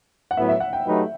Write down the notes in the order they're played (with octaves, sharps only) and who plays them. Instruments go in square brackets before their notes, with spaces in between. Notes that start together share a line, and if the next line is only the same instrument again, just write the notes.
[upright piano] F#5
[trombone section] A2 F#3 B3 E4 [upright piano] E5
[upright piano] E5
F#5
G5
[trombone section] F#3 A3 D#4 G4 B4